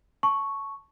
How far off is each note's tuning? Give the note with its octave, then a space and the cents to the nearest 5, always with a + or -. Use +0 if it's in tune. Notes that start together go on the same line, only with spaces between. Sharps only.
A5 +0 C#6 +0